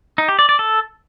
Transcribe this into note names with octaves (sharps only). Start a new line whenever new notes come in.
D#4
G4
D5
D5
A4